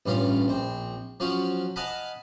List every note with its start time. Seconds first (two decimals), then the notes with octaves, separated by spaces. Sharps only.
0.06 A1 G2 C#4 F4 F5
0.48 A#1 C4
1.20 F3 F#3 C#4 F5
1.76 D#5 F5 F#5 G#5 A5 B5